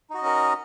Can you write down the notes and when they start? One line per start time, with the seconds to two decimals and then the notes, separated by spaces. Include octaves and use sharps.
0.10 D#4
0.14 F#4
0.18 D#5
0.22 C#4
0.26 A#4